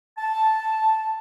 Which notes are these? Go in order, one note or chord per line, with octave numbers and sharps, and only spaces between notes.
A5